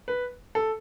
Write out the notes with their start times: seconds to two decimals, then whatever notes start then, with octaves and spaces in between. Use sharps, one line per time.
0.08 B4
0.55 A4